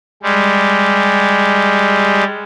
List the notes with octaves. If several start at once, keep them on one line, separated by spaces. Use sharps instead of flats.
G3 G#3